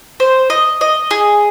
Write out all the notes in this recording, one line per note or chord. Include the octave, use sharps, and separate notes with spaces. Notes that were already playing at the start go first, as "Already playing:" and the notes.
C5
D#5
D#5
G#4